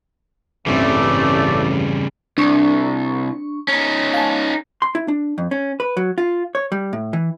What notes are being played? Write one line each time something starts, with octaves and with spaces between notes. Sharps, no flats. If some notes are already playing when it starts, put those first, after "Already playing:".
A1 E2 G2 C#3 G3 A3 C4 D5
C2 D4 C#6
C#4 D#4
F5 G#5 A5
C6
E4
D4
F2
C#4
B4
F#3
F4
C#5
G3
A2
E3